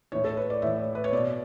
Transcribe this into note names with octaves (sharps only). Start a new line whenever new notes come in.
A2 E3 C#5
A4
B4
D5
A2 E3 E5
B4
C#5
B2 D5